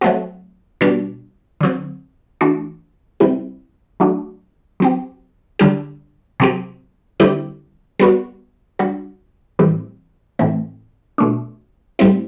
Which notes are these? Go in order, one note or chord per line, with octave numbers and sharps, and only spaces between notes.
F#3 A3 C4 F#4
B2 G3 D4
D3 F#3 C4
E3 A3 D4 F#4
C3 G3 C4 E4 G4
F#3 A3 D4 F#4
F#3 C4 G4
D3 G3 D4 G4
C3 F#3 C4 G4
D3 G3 C4 E4 G4
G3 B3 F#4
G3 D4 F#4
A2 E3 G3 C4 G4
A2 E3 A3 C4
B2 A3 D4
A2 G3 C4 E4